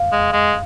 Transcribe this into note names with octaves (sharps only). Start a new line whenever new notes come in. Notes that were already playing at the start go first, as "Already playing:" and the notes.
Already playing: F5
G#3
G#3